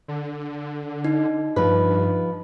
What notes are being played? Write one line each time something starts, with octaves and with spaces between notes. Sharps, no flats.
D3
D#4
G2 F3 B4